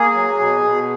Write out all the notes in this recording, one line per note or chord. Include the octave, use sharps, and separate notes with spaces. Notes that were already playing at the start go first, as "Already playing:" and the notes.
Already playing: A#3 G#4
F#3
B2
B2